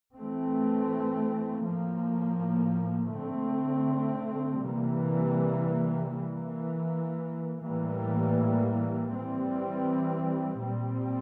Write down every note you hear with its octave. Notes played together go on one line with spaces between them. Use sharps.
E3 A3 C4
A2 F3 A#3
D3 A3 C4
C3 E3 G3 A#3
E3 A#3
A2 E3 G3 A#3
E3 G3 C4
A#2 G3 C4